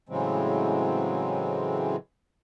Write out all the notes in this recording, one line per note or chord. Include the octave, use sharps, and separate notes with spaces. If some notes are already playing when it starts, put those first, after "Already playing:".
A2 C#3 E3 F#3 G#3 C4